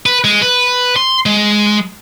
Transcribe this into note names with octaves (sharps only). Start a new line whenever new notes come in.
B4
G#3
B4
C6
G#3